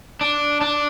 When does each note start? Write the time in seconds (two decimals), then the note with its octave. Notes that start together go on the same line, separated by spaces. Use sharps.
0.21 D4
0.61 D4